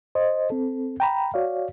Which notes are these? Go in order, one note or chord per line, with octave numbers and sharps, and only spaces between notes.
C5 D#5
C4 A4
G5 A#5 B5
F#4 C#5 D5 F5